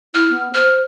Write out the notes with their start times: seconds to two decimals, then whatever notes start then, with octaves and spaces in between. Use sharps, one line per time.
0.15 E4 F6
0.30 B3
0.54 C5 F6